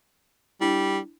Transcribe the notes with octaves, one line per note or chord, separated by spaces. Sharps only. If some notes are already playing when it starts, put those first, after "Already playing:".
G3 D4 E4